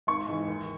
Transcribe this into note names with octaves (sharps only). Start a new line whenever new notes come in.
G#1 C#6
G#2 E3
D#2